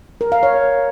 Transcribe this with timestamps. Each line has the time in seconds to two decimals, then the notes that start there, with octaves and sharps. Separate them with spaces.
0.21 A#4
0.32 F5
0.43 C#5